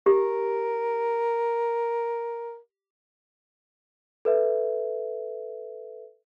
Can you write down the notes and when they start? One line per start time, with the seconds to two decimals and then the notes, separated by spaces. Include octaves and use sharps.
0.06 G4 A#4
4.25 A4 B4 E5